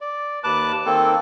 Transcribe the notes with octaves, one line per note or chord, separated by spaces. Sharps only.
D5
D#2 B4 A5 D6 F#6
D#3 A#3 C4 A4